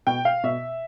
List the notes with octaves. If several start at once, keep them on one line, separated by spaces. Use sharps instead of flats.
B2 G5
F5
B2 E5